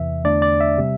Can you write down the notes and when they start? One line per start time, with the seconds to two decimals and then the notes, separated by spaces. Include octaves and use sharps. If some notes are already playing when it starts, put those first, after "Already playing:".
Already playing: E2 C3 E3 E5
0.24 E2 D3 A3 D4 D5
0.42 D5
0.61 E5
0.78 C3 G3